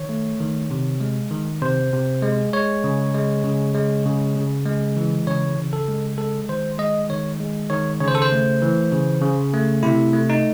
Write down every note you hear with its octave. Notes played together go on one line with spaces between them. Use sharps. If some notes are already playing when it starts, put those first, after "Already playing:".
Already playing: D#3 C#5
A3
D#3
C3
G#3
D#3
C3 C5
C3
G#3
G#3 C#5
C#3
G#3
C#3
G#3
C#3
C#3
G#3
E3
C#3 C#5
C#3
A4
G#3
G#3 A4
D#3 C5
G#3 D#5
D#3 C#5
G#3
D#3 C#5
C#3 C#5
C5
A4
C5
A3
E3
C#3
C#3
A3
C3 E4
A3
D#4